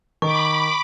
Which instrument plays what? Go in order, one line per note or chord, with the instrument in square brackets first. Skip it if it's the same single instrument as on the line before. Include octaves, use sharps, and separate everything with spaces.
[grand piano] D#3 [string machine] B5 D6 [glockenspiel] C#6